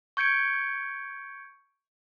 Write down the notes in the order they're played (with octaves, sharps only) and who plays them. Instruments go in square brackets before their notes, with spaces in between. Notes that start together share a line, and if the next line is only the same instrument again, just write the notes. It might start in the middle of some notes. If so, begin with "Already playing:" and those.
[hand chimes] C#6 G6 G#6 C#7 D7